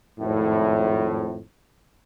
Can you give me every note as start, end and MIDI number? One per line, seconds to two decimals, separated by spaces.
0.20 1.40 32
0.20 1.40 41
0.20 1.40 45